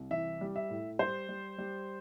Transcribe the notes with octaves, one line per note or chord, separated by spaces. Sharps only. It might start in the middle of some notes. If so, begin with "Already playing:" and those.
Already playing: C2
E3 E5
G3
E5
A2
G3 C5
G3
G3